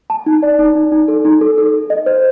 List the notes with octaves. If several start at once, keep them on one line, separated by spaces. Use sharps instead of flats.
A5
D#4
D5
D#4
D#4
D#4
A4
D#4
A4
A4
A4
D#5
C5